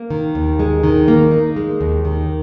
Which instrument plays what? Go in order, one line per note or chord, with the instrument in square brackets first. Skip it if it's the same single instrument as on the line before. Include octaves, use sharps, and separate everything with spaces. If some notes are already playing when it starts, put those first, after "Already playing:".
Already playing: [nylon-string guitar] A#3
D#3
D#2
G#3
D#3
A#3
D#4
G#3
D#2
D#3